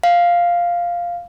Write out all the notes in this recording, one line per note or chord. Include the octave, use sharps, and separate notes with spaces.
F5